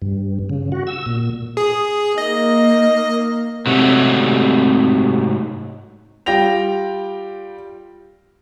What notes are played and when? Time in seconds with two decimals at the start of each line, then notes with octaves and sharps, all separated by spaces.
0.02 G2
0.50 C#3
0.72 F#4
0.87 E6
1.06 A#2
1.57 G#4
2.18 A#3 D#4 D#5
3.66 G#2 C3 F#3 A3
6.26 G3 F4 G5 A#6 F7